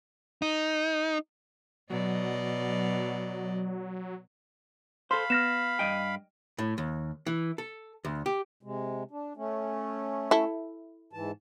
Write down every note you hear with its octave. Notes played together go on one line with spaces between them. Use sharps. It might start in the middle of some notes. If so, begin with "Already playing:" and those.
D#4
B2 F#3 D5 D#5
A4 C5 F5 B5 C6
B3 F6 A#6 E7
G2 D#5 G5
A2
D#2
E3
A4
D2
G4
C3 G#3
D4
A3 C#4
E4 A4
G#2 E3 A5